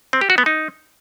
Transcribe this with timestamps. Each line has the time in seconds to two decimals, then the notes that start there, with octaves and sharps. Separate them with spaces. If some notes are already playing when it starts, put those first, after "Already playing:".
0.13 C4
0.21 G4
0.30 F#4
0.38 B3
0.46 D#4